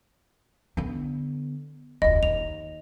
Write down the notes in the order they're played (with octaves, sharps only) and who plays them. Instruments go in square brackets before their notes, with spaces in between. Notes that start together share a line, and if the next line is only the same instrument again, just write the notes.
[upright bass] D3 B3
[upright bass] E1 C#2 [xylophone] D#5
[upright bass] D#2 [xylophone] F7